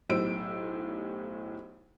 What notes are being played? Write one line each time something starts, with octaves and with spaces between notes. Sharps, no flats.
B1 A2 G4 C5 E6 D7